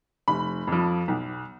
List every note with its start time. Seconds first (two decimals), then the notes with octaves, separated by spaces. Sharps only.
0.28 F1 B5
0.67 F2 F3
1.08 B1